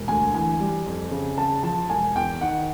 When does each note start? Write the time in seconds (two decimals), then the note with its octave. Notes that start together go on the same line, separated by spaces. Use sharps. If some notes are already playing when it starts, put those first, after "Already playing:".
Already playing: E1
0.08 D2 G#5
0.34 E3 G#5
0.60 G3
0.86 F2
1.11 C#3
1.37 C#3 A5
1.63 F3 A5
1.90 E1 G#5
2.15 E2 G5
2.41 D#3 F#5